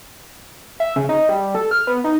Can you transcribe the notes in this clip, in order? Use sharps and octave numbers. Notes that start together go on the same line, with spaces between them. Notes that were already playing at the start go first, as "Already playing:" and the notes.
E5
C#3
D#4
G3
A4
F6
B3
D#4